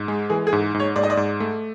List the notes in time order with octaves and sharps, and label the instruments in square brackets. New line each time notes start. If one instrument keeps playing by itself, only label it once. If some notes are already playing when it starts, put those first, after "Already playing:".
Already playing: [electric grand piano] G#2
G#3
[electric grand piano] E3 [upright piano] G#4
[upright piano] G#4
[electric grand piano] G#2
G#2
[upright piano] C#5
[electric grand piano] G#2 [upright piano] D5
[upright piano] D#5
D5
[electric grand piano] G#2
A3